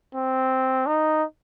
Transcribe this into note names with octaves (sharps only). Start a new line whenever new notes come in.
C4
D#4